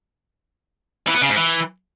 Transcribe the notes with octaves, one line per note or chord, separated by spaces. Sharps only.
E3
B3
C#3
G#2
E3